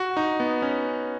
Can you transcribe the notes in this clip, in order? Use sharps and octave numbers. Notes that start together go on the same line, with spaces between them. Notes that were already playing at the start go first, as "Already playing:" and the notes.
Already playing: F#4
D#4
B3
C#4